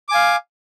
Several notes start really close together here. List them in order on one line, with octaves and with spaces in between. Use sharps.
D6 G#5 F5